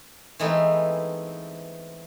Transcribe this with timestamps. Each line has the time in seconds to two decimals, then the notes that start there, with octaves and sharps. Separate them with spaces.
0.39 E3 G#3 A3 B3 C4 D#4